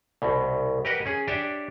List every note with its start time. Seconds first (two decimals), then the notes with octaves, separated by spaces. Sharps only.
0.22 C2 B2
0.85 G4 A#4 B4 D#5 F#5
1.06 C#4 G#4
1.28 D4 G4 C#5 E5